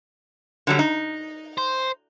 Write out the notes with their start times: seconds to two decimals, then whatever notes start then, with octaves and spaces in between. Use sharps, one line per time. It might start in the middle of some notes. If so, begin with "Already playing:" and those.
0.67 D3 F#3 G3
0.79 D#4
1.58 C5